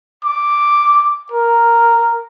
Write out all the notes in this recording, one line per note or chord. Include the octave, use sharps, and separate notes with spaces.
D6
A#4